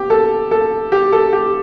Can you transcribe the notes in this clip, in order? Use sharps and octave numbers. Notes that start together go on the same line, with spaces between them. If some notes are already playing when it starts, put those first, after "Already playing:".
Already playing: B3 G4
A4
A4
G4
A4
G4